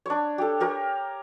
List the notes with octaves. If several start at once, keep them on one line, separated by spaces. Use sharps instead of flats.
D4 C#5
G4 A4
G4 A#4 C#5